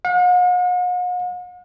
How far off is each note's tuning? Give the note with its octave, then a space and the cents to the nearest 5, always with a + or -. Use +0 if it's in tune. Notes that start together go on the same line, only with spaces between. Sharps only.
F#5 -45